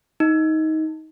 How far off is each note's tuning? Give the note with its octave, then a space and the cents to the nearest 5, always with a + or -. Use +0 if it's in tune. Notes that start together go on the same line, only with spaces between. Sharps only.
D#4 +15